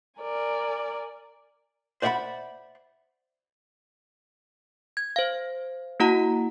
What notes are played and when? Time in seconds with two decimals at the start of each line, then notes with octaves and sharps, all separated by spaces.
0.22 A#4 D5 G#5
2.02 C5 D5 E5 F#5 B5
4.97 G#6
5.16 C5 F5
6.00 A#3 E4 F#4 F#5 A#5